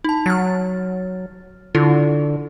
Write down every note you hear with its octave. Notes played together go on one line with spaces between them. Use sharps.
D#4 A5
F#3 F6 A6
D3 E4 F4 A4